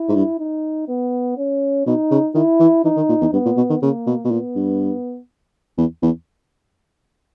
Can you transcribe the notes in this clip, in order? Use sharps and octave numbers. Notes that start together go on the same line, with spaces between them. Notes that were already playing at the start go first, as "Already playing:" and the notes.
Already playing: E4
G#2
G2
D#4
B3
C#4
B2 D#4
C#3
D#3 E4
E3
E3 D#4
D#3
A#2
E2
G2 B3
A#2
B2
D#3
C#3 A#3
B2
B2
A#2 B3
G2
E2
E2